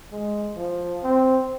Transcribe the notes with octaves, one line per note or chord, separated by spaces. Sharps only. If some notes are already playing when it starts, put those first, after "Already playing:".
G#3
F3
C4